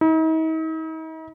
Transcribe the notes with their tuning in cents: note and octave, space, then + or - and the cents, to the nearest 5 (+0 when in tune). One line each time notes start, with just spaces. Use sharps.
D#4 +45